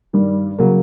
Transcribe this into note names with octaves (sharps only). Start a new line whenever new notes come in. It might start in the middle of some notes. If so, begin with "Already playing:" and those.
G2 D#3 G3
C#3 F#3 A#3